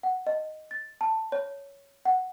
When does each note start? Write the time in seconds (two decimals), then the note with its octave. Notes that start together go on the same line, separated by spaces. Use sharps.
0.03 F#5
0.27 D#5
0.71 A6
1.01 A5
1.32 C#5
2.05 F#5